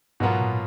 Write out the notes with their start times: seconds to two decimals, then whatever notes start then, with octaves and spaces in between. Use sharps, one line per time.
0.20 G#2 B2 F#3 B3 F4 A#4
0.41 A#2